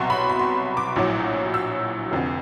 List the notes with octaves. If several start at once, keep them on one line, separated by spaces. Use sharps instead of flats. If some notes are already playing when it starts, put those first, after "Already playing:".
Already playing: C2 B2 F#3 C6
B5
B5
C6
D6
A#1 A2 F#3
E6
F1 F2 D3